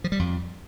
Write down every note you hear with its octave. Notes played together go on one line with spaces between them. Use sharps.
F3
G3
F2